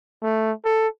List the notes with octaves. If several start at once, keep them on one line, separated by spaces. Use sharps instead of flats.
A3
A4